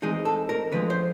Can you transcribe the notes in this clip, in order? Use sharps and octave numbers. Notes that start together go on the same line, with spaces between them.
E3 G#3 C4 D#4 G#4
A4
A#4
D3 F3 G#3 B4
C5